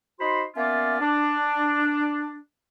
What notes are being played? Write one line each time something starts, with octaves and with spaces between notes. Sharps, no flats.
D#4 F#4 C5 B5 C6
A#3 B3 C#4 F4 D5 E5
D4